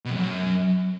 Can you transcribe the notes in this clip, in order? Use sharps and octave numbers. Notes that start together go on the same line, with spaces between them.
B2
F2
F#2